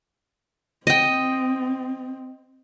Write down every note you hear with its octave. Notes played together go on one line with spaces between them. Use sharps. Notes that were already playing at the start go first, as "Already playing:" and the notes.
C4 D#5 G5